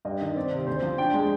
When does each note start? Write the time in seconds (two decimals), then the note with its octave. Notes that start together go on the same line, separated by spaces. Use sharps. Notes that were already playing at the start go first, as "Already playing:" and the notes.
0.05 G2 D#5
0.21 D#3
0.36 C4 D5
0.51 C3
0.67 D2 C5
0.82 F3
0.98 D4 G5
1.14 G#3